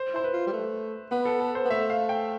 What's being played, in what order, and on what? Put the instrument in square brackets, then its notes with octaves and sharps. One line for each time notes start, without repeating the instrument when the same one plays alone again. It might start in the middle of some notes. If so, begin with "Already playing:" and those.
Already playing: [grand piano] C5
[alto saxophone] E4 [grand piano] C5
[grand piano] B4
[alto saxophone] F4
G3
A3
[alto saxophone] B3 [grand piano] B4
[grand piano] A4
A4
C5
[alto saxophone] B3
[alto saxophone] A3 [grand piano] E5
[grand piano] F5
G5